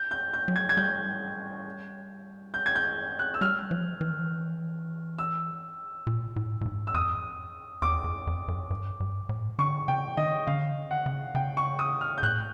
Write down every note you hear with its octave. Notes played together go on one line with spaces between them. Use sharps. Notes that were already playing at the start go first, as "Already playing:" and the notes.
Already playing: G6
G6
G6
F#3
G#6
G#6
G3 G6
G6
G#6
G6
F#6
E6
G3 F6
F3
E3
D#3
E3
E6
A#2
A2
A2
G#2
E6
F2 D#6
E2 D6
F2
F2
F#2
G2
G2
A2
D3 C#6
C#3 G5
D#3 D#5
D3 F5
C#3
D3
F#5
C#3
C#3 G5
C#6
D#6
F6
G6
A2 F#6